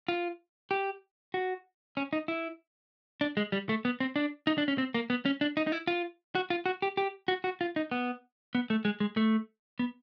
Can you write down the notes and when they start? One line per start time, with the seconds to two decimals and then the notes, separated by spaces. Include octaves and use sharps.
0.08 F4
0.71 G4
1.34 F#4
1.97 C#4
2.13 D#4
2.28 E4
3.21 D4
3.37 G#3
3.52 G3
3.69 A3
3.85 B3
4.00 C4
4.16 D4
4.47 D#4
4.58 D4
4.68 C#4
4.78 C4
4.94 A#3
5.10 B3
5.25 C#4
5.41 D4
5.57 D#4
5.67 D#4
5.72 E4
5.87 F4
6.35 F#4
6.50 F4
6.66 F#4
6.82 G4
6.97 G4
7.28 F#4
7.44 F#4
7.61 F4
7.76 D#4
7.91 B3
8.55 B3
8.70 A3
8.85 G#3
9.00 G#3
9.17 A3
9.79 B3